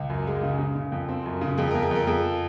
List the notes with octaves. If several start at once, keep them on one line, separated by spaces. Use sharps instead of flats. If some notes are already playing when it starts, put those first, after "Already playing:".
Already playing: C#2
F#2
G#3
C#3
C#3
C#3
F2
C4
F#2
C#3
F2 G#4
F2 A#4
G#4
F2 A#4
F2 G#4